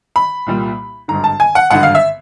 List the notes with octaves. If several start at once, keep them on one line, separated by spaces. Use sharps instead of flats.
B5
C2 A#2 G3
G#1 G2 D3 A#5
A5
G#5
F#5
G#1 G2 D3 F#5
F5
E5